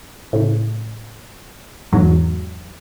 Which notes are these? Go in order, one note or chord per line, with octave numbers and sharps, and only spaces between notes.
A2 C#3
E2 G#2 F#3